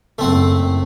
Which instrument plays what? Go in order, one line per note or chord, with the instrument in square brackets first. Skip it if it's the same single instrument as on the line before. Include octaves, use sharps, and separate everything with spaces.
[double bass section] F#1 [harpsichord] A3 C4 F#5